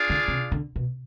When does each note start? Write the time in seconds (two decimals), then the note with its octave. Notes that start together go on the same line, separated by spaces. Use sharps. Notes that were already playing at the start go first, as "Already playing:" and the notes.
Already playing: D4 F4 G#4 D5 F5
0.10 D3
0.28 C3
0.52 D3
0.76 B2